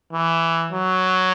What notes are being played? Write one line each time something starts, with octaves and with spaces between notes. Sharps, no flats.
E3
F#3